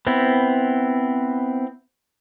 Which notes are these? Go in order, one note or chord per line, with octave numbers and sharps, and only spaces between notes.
B3 C4 E4